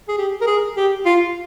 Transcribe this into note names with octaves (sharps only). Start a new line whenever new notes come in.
G#4
G4
A#4
G#4
G4
F4